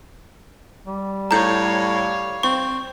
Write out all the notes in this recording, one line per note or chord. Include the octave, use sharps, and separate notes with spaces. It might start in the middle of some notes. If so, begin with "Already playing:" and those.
G3
A2 C#5 F5 A#5 G6
C4 C#6